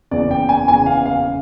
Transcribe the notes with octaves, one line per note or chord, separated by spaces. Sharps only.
F#1 E2 C#3 E3 D5
G5
G#5
F#1 E2 C#3 E3 G#5
F5
F5
C#3